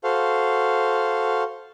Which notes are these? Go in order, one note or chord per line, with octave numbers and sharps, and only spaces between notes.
F#4 A4 C5 F5